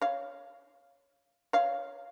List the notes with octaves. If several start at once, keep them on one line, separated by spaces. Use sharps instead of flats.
C#5 F5
C#5 F5